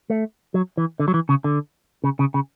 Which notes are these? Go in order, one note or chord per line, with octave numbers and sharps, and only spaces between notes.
A3
F#3
E3
D3
F#3
E3
C#3
D3
C#3
C#3
C#3